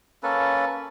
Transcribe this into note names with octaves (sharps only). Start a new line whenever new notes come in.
A#3 C#4 A4 B4